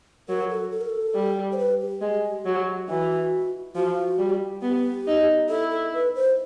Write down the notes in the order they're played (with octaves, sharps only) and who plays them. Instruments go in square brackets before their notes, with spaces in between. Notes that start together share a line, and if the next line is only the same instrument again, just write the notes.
[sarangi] F#3 [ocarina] A#4
[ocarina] A4
A4
A#4
A4
[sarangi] G3
[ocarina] C5
B4
G4
[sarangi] G#3
F#3
[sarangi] E3 [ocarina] F#4
[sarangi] F3 [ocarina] F#4
[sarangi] G3
[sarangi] B3 [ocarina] G4
[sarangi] D#4
[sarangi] E4 [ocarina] A4
[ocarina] A4
B4
C5